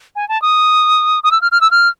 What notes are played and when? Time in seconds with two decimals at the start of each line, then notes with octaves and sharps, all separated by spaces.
0.16 G#5
0.29 A5
0.42 D#6
1.24 D#6
1.32 E6
1.42 F6
1.52 F6
1.61 E6
1.71 F6